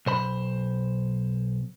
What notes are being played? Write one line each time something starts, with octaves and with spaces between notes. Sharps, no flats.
B1 C5 B5